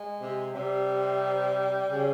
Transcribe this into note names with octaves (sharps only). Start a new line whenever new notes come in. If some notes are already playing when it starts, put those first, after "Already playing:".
Already playing: G#3
C3
C3 G3
C#3